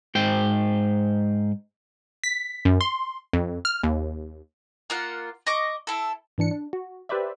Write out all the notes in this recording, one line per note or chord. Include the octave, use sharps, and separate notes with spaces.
G#2 C5 G5
B6
F#2
C6
F2
F6
D#2
A#3 F4 F#5
D#5 C#6 D6
E4 A4
G#2 E3 D4 C#7
D4
F#4
G4 B4 C5 D5 E5